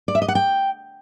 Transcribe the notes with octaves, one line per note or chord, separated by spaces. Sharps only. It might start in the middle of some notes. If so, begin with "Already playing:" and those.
D5
E5
D#5
F#5
G5